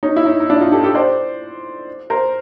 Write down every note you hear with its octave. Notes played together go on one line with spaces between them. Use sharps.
C#4 D#4
E4
C#4 D#4
D#4
D4 E4
D#4 F4
G4 A4
G4 A4
C5 D5
A#4 C5